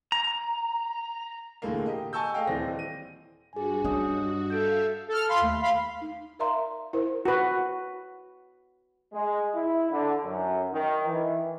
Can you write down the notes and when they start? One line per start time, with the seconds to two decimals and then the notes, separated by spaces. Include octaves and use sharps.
0.12 A#5
1.62 E1 A2 D3 G#3 A#3
1.86 G4 D#5
2.13 G#5 A5 C#6 E6 G6
2.34 A3 G#4 D#5 F5 G5
2.47 D#1 E3 C4 D5 A#6
2.79 D#7
3.53 G2 F#4 G#4 G#5
3.84 D4 C#5 D#5 D#6
4.50 A4 E5 F5 G6 D7
5.08 A4 F6
5.28 F5 B5 C6
5.41 D#2 A3
5.62 F5 B5 C6
6.01 D#4
6.39 A#4 D5 E5 F5 A#5 C6
6.93 E4 A#4 C5
7.25 F#4 B4
9.13 G#3
9.54 E4
9.91 D3
10.24 F#2
10.72 D#3
11.05 E3